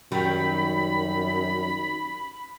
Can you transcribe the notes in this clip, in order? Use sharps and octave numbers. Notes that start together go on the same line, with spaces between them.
F#2 D#3 F#3 G3 B5